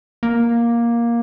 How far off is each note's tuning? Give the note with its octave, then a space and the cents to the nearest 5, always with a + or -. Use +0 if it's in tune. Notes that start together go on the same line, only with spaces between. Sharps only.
A#3 +10